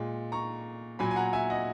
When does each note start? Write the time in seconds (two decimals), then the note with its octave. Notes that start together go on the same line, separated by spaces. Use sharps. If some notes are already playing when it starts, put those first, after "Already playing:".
Already playing: A#2 G#3
0.32 A#5 C#6
0.99 A#2 F#3 G#5 B5
1.11 G#5
1.16 F#5 A#5
1.33 E5 G#5
1.50 D#5 F#5